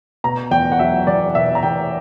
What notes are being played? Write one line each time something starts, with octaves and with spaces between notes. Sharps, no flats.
B2 A#5
E2 G5
F#5
F#3 E5
E2 D5
B2 E5
A#5
E2 G5